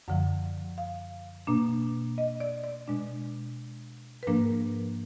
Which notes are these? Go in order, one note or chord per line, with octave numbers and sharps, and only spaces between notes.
F#2 D3 F3 F#5
F5
B2 A#3 D4
D#5
D5
D5
B2 G#3 D4
B4
G#2 F3 A#3 D4 A#4